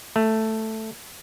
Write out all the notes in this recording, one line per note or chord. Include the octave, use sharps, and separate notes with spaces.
A3